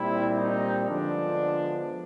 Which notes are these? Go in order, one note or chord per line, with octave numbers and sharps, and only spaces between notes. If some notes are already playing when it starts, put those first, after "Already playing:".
Already playing: A#2 G3 C4 E4
D#4
D3 F3 G#3 B3 D4